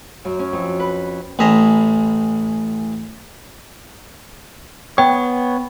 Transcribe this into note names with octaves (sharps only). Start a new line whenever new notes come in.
F#2
C#4
F2
B4
A1 A2 G#4 E5 A#5 C6
B3 C#5 G5